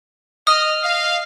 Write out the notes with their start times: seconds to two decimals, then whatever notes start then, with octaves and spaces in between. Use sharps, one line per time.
0.47 D#5 D#6 F6
0.84 D#5 F5